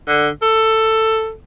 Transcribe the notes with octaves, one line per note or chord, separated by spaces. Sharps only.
D3
A4